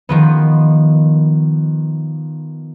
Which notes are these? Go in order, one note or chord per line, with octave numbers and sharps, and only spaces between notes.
D#3 F3 B3